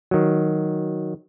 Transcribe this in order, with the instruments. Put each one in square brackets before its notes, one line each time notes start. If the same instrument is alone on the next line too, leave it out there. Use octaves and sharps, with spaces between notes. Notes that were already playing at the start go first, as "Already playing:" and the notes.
[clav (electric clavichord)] D#3 F#3